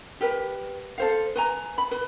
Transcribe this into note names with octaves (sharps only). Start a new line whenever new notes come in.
G4 A#4 B4
A4 C5 F5
B4 G#5 A#5
B5
B4